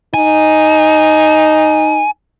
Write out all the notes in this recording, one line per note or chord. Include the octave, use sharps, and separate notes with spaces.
D#4 G#5